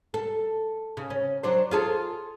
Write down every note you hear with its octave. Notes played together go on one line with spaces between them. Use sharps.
A4
C#3
C#4
F#3 D4 C5
F4 G#4 A4